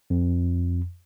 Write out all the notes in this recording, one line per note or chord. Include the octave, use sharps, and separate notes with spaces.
F2